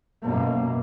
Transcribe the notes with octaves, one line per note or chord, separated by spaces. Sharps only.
F#2 B2 A#3